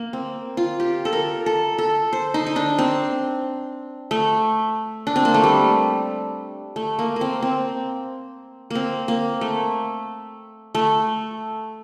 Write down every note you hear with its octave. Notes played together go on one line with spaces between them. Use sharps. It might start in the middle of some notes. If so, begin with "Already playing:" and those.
Already playing: A#3
C4
F4
G4
A4
A#4
A4
A4
C5
D#4
D#4
D4
C4
A3
D4
C4
A#3
A3
G3
A3
A#3
A#3
C4
C4
A#3 C4
A#3
A3
A3